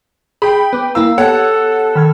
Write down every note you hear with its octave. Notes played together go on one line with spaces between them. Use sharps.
G#4 G5 B5
B3 B4 D6
A#3 E4 F5 A#5 E6
B3 G4 A4 C#5 F#5
D#3 B5 F6 G#6